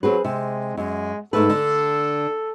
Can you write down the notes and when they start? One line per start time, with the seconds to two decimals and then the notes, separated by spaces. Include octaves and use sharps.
0.03 F#3 C4 G#4 B4
0.24 C3 G#3
0.77 F#2 G#3
1.33 G#2 A3 A4 B4
1.50 D3